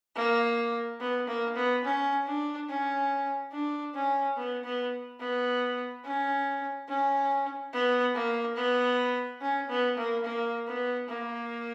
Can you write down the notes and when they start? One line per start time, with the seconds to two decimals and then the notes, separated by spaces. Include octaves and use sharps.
0.15 A#3
1.00 B3
1.27 A#3
1.56 B3
1.84 C#4
2.27 D4
2.69 C#4
3.52 D4
3.94 C#4
4.37 B3
4.64 B3
5.20 B3
6.05 C#4
6.88 C#4
7.73 B3
8.15 A#3
8.56 B3
9.41 C#4
9.69 B3
9.97 A#3
10.24 A#3
10.67 B3
11.08 A#3